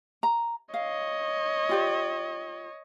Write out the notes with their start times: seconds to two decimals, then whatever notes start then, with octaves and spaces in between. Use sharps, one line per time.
0.23 A#5
0.74 C#5 D#5 F5
1.69 F4 G4 D5